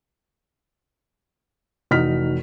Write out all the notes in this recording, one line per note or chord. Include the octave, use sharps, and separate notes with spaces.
F1 E3 D#4 F#4 F6 B6